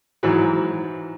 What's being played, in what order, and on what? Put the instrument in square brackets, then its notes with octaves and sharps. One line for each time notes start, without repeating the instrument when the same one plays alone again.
[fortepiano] G#2 E3 F#3